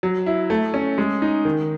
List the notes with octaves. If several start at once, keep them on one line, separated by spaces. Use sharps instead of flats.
F#3
E4
A3
C#4
G#3
D#4
D#3